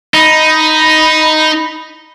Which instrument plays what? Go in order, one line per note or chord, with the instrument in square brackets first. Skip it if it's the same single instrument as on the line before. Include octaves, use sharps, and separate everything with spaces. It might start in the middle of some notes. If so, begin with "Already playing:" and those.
[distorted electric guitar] D#4 [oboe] B5